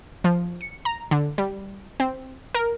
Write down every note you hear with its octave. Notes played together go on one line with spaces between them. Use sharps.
F3
C#7
A#5
D3
G3
C4
A#4